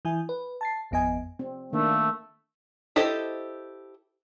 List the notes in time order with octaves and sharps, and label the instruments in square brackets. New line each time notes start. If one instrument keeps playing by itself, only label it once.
[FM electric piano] E3 E4 G#5
B4
A5 A6 C7
G#1 F2 B3 D#5 G#5
[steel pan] C4
[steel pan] D#3 A#3 D4 [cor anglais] A3
[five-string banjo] E4 G4 A4 C5 D#5